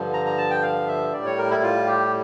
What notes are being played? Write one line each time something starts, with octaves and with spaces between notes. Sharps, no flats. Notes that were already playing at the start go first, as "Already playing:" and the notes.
Already playing: G2 D3 F3
A#5
A#5
A5
G5
F5
E5
A2 G3 D5
C#5
A#4
E4
F4
G4